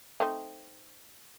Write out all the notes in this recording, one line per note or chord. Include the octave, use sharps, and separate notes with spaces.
A3 C4 D#4